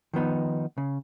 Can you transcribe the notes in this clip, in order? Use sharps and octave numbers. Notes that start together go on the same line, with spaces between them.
D#3 F3 B3 D#4
C#3